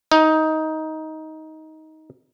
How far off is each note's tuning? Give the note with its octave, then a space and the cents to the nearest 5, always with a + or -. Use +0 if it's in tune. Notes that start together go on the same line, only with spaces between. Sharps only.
D#4 +15